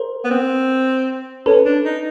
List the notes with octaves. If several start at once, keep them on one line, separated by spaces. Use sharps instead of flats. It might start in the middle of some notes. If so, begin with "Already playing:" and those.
Already playing: A#4 C5
B3
C4
C#4 A4 B4
D4
D#4